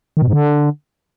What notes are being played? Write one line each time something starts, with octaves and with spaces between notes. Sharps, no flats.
D#3
B2
G#2
D3